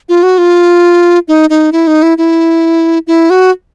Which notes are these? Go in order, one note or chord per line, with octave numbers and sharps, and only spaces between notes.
F4
F#4
F4
D#4
D#4
E4
D#4
E4
E4
E4
F#4